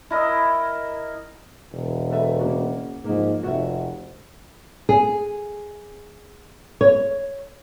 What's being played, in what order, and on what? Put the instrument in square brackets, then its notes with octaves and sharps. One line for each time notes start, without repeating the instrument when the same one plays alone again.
[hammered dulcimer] E4 A#4 D#5
[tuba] E1
[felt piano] A3 B4 E5
C#3 A#3 F#4
[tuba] G#2 [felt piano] F3 A#3
[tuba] F1 [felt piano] F#4 E5
[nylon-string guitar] G#4
C#5